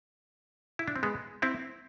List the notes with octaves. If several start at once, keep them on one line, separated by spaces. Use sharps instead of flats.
E4
D4
C4
G#3 B3
C4 E4